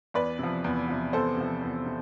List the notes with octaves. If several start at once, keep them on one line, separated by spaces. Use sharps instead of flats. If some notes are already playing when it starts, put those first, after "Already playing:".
E2 B4 D5
C3 F3
E2
C3 F3
E2 A4 C5
C3 F3
E2
C3